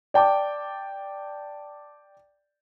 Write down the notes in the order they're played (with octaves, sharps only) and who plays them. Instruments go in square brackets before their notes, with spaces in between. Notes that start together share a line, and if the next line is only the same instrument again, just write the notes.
[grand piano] D5 G5 A5 D6